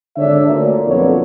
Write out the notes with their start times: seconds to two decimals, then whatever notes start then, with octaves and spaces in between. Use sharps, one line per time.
0.17 G#1 D3 D4 C#5 D5 E5
0.47 D2 A#2
0.87 B1 F2 D3 A#3 B3 C#5